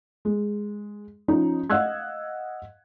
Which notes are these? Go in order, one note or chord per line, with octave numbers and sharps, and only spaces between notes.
G#3
F3 C#4 D#4
D#5 F5 F#5 E6 F#6 G#6